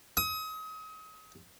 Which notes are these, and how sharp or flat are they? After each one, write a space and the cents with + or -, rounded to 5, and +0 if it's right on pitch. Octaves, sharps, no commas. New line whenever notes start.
D#6 +35